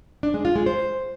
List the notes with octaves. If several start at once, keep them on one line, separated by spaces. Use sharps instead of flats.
D4
G#3
F4
G#3
C5